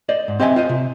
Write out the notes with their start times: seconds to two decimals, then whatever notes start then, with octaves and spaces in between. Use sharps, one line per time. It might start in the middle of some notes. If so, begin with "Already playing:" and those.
0.09 C5 D5 D#5
0.28 G#2
0.40 C4 G4 D#5 E5 G5 G#5
0.56 F4 C5 D#5
0.69 C3